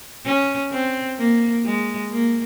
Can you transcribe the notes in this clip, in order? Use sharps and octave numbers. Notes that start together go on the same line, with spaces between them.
C#4
C4
A#3
G#3
A#3